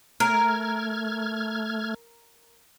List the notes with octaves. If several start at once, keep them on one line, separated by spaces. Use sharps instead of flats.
A3 A#4 F6 G#6